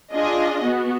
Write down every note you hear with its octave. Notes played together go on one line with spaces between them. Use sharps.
D4 F4 G#4 D#5
B3 F#4